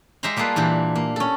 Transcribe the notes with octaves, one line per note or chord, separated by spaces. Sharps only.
G#3 G4 E5 F5 A#5 C6
G3 A#3 F4 G#4 A4 B4
A#2 E3 D4 G4
A#3
C#4 A4